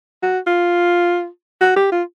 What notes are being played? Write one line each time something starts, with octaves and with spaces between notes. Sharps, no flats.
F#4
F4
F#4
G4
F4